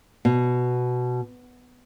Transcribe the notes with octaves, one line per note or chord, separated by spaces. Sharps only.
B2